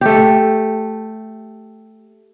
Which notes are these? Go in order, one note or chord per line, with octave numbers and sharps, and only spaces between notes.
A3 G4